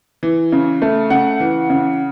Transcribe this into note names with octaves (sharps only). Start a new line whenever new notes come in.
E3
C#3
A3
C#3 F#5
E3
C#3